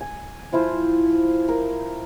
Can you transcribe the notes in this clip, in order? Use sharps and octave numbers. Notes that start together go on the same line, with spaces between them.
G#5
F3 E4 F4 C5
A#4